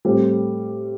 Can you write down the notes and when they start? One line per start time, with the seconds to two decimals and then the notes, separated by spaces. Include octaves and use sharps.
0.05 A2 G3 C4